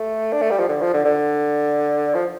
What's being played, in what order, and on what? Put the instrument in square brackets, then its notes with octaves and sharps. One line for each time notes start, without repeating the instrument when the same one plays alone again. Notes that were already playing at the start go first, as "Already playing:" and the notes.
Already playing: [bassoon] A3
D4
A3
G3
F3
D3
F3
D3
D3
F3